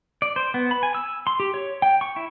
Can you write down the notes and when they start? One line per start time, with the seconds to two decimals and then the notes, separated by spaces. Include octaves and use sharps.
0.22 D5
0.36 C5
0.54 B3
0.71 B5
0.83 G#5
0.95 E6
1.27 C6
1.40 G4
1.54 C#5
1.82 G5
2.01 C#6
2.16 E4